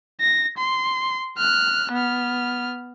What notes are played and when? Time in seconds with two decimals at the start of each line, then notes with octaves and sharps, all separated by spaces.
0.21 A#6
0.58 C6
1.38 F6 F#6
1.92 B3 F6